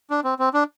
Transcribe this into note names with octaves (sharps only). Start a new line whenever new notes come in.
D4
C4
C4
D4